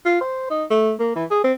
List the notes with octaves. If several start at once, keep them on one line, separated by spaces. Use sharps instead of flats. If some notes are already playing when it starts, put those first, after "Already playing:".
F4
C5
D#4
A3
A#3
E3
G#4
C4